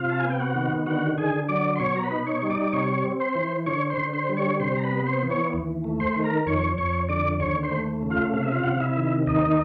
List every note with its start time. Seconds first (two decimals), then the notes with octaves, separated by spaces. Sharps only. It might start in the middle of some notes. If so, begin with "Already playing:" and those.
Already playing: C3 F4 F5
0.10 A5
0.20 B3 G#5
0.30 G5
0.40 F#4 F#5
0.55 D#3
0.86 D3 F#4 F#5
1.18 D3 G#4 G#5
1.48 F#3 D5 D6
1.76 C6
1.80 B2 C#5 C#6
1.96 A#5
2.03 B4 B5
2.11 D#4
2.27 C#5 C#6
2.42 G3 C#6
2.50 D5 D6
2.62 D6
2.73 C3 C#5 C#6
3.04 C4
3.20 C5 C6
3.35 E3
3.66 D3 C#5 C#6
3.90 C5 C6
3.98 D3
4.13 C5 C6
4.29 G3
4.37 C#5 C#6
4.60 C3 C5 C6
4.77 A#5
4.84 B4 B5
4.91 B3
5.06 C5 C6
5.22 E3
5.30 C#5 C#6
5.53 D#2
5.84 A3
6.00 C5 C6
6.16 D#3
6.24 A#4 A#5
6.46 F2 C#5 C#6
6.78 F2 C#5 C#6
7.09 D3 D5 D6
7.40 D#2 C#5 C#6
7.63 C5 C6
7.71 A3
8.03 C#3
8.10 F4 F5
8.34 C3 F5
8.43 E5
8.52 F4 F5
8.64 C3 F#5
8.72 F5
8.80 E4 E5
8.96 D#3
9.26 D#2 D#4 D#5